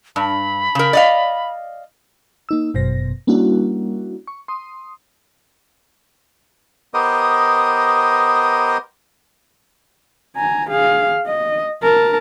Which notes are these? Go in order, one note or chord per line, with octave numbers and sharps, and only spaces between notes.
G2 B5
C#3 A#4
D5 D#5 F5
A#3 D#4 E6
G1 F#2 B2 C5 A#6
G3 A#3 C#4 D4 E4 F#4
C#6
C6 D#6
B3 G4 A#4 C5 D#5 D#6
G#5 A#5
G#4 F5
D#5
A#4 A5